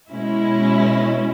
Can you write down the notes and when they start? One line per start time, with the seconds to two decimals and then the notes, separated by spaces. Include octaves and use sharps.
0.12 B2 G#3 C#4 E4